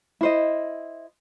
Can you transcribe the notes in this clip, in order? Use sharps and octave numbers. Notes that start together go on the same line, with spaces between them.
E4 C5 D#5